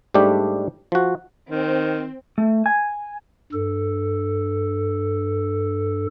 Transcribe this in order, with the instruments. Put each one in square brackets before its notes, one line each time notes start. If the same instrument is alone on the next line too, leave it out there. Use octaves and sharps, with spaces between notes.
[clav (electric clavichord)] G#2 G3 A3 D4 G4
F3 F#4
[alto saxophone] D#3 [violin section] C4
[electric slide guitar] A3
G#5
[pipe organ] G2 A4